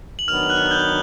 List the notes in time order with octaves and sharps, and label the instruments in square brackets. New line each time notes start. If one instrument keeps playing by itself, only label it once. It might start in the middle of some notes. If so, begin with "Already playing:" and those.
[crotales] F#7
[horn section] D#3 F#3 B3 D4 [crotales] F6 F7
[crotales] F#6 F#7
G6 G7